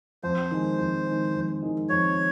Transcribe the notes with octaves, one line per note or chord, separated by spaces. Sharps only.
F2 C5
D#3 G#3
F2
D#3 G#3
F2
D#3 G#3
F2 C#5